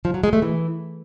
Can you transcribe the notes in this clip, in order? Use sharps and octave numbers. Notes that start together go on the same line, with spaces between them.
F3
F#3
G#3
A3
E3